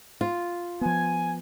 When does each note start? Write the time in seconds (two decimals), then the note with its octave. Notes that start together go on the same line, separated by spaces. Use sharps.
0.21 F4
0.81 F3 B3 G#5